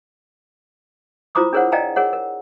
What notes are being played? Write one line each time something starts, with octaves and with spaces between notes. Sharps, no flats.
E4 F4 C5 A#5 D6 D#6
D4 G#4 A#4 C5 C#5 F#5
D5 D#5 F5 G5 G#5 A#5
G#4 A#4 C#5 F#5
A#4